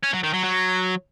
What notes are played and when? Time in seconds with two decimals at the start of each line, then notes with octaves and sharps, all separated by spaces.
0.04 C#4
0.14 F#3
0.24 D#3
0.34 F#3
0.44 F#3